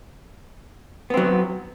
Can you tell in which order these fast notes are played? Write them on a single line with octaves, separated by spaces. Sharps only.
B3 C4 F#3